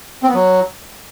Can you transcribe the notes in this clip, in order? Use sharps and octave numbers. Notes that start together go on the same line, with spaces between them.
C4
B3
F#3